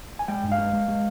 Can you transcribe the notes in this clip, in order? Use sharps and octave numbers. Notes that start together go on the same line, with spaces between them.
G#5
G#3 G5
G2
F5
G#3
G#3
G#3